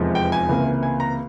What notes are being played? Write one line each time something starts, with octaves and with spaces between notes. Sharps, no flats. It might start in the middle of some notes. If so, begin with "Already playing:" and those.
Already playing: F1 E2 C3 F3 G#3
G5
G#5
C#2 C3 E3 A#3
G#5
A#5